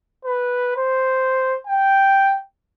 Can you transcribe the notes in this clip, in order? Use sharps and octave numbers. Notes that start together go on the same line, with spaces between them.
B4
C5
G5